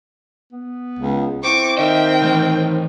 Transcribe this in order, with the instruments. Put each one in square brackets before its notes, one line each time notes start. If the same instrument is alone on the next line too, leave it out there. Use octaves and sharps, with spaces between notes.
[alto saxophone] B3
[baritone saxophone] C#2
[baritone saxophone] C4 [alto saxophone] E4 [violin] C#6 D6
[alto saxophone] D#3 [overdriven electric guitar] D#5 E5 [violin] G5
[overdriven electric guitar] E3 A3